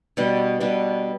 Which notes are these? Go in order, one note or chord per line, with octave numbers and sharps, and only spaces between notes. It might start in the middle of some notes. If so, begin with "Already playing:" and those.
B2 G3 D4
B2 G3 D4